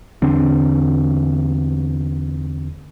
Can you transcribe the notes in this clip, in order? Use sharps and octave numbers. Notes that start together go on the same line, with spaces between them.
E2 D3 C4 D4